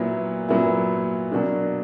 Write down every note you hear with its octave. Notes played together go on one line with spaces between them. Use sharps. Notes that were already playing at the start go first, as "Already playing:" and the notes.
Already playing: A#2 F#3 B3 E4
A#2 F#3 B3 E4
B2 F#3 A#3 D4